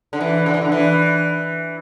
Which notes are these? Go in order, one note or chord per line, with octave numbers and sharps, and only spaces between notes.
D3
E3
D3
E3
D3
E3